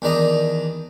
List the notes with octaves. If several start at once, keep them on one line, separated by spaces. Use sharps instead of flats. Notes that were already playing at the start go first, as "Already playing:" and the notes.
E2 D#3 D4 D5 A#5 D#6